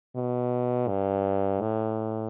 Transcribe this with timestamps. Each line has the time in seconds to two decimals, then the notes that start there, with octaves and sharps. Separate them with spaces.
0.16 B2
0.88 G2
1.61 A2